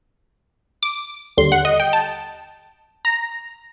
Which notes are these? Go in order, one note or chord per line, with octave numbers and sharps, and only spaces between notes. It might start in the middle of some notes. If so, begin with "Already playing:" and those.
D6
D#2 D3 G3 C6
F#5
D#5
G5
A5
A#5